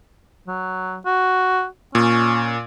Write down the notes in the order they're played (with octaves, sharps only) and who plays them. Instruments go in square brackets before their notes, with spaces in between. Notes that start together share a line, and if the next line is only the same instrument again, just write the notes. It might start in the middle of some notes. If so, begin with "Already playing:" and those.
[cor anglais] F#3
F#4
[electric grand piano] A#2 [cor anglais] C#4